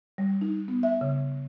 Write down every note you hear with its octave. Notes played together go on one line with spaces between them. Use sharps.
G3
D#4
B3
E5
C#3